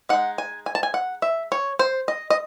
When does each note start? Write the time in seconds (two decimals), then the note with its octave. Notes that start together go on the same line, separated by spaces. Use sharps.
0.09 G#3 D#4 F#5
0.38 G#5
0.66 G#5
0.75 A5
0.83 G#5
0.94 F#5
1.22 E5
1.52 C#5
1.79 C5
2.08 D#5
2.30 D#5